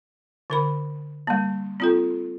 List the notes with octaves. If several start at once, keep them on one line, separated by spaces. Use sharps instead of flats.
D3 A#4 B5
G3 A#3
C4 F4 A4